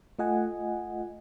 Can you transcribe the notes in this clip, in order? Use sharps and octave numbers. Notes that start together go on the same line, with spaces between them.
A3 F4 D#5 F#5 G#5